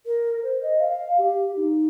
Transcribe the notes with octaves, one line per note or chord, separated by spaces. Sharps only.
A#4
C5
D#5
F5
G4
D#4